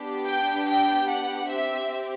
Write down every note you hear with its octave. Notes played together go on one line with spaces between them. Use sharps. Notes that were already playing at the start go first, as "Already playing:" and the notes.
Already playing: B3 D4 G4
G5
G5
F#5
C4 G4 E5